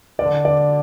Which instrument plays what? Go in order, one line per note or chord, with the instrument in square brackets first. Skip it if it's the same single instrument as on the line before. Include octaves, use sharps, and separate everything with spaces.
[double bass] D3 [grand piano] D5
[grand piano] D5